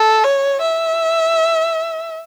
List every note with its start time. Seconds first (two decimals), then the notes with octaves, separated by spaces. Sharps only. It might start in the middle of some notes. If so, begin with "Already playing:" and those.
Already playing: A4
0.24 C#5
0.61 E5